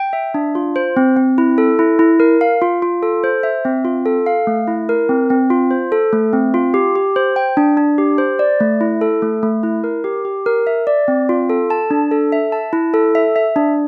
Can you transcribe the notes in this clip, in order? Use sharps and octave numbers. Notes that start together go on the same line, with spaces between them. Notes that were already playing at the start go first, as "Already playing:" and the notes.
Already playing: G5
E5
D4
F4
C5
C4
C4
E4
A4
E4
E4
A#4
F5
F4
F4
A4
C5
E5
C4
F4
A4
F5
A3
E4
A#4
C4
C4
F4
C5
A4
A3
C4
F4
G4
G4
C5
G5
D4
D4
G4
C5
D5
A3
E4
A4
A3
A3
E4
A#4
G4
G4
A#4
E5
D5
C4
F4
A4
A5
D4
A4
E5
A5
E4
A4
E5
E5
D4